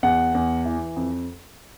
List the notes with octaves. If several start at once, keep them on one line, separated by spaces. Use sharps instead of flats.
E2 F#5
E2
E3
F2